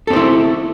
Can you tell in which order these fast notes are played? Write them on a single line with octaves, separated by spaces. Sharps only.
A4 C4 C5 E4